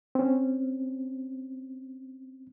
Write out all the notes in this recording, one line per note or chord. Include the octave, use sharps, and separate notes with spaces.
C4 C#4